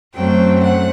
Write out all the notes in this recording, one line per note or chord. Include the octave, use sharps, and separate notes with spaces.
F#2 F#3 A3 C4 G5
F#5